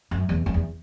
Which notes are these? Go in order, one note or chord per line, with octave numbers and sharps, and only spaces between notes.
F#2
E2
F#2
E2